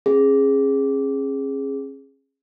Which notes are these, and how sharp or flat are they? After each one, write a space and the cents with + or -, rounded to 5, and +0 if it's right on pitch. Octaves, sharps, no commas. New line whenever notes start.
C#4 -35 G#4 -5